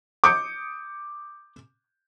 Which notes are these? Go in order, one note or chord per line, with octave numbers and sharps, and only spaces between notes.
D6 D#6 G6 C#7